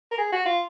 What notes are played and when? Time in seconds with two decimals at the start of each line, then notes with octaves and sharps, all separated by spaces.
0.11 A#4
0.18 G#4
0.32 F#4
0.45 F4